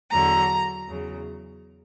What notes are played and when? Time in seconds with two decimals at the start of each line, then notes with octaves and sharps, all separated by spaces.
0.11 E2 D3 F#3 A#5
0.87 E2 C#3 F#3